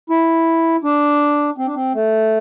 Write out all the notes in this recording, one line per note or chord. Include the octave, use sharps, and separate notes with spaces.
E4
D4
C4
D4
C4
A3